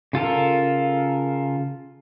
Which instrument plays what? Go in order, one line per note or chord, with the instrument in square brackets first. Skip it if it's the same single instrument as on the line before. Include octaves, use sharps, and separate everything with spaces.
[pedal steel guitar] C#3 F4 A4 A#4